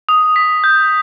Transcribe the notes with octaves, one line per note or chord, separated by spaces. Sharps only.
D#6
B6
G6